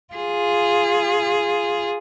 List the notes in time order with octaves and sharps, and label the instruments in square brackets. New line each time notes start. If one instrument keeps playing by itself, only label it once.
[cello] F4 G#4